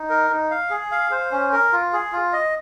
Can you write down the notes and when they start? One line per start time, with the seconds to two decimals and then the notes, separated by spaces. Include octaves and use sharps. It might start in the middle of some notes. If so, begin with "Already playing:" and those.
Already playing: D#4
0.09 A#4
0.30 D#4
0.51 F5
0.70 G#4
0.92 F5
1.11 C5
1.32 C#4
1.52 A#4
1.73 F4
1.93 G#4
2.12 F4
2.33 D#5